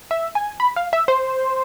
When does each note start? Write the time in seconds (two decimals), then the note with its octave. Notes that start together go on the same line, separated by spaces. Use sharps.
0.11 E5
0.35 G#5
0.60 B5
0.76 F5
0.93 E5
1.08 C5